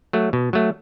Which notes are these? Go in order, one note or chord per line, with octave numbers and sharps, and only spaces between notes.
F#3 A3
B2
F#3 A3